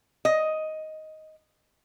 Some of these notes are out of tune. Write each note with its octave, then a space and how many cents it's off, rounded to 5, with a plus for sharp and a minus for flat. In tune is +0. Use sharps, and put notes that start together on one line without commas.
D#5 +5